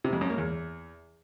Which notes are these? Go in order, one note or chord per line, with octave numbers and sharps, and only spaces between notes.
C3
F2
F#2
A#3
E2